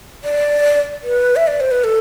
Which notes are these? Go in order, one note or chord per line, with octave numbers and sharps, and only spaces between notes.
D5
B4
E5
D5
C5
B4
A4